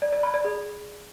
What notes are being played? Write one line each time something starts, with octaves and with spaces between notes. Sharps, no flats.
D5
D5
B5
D5
G#4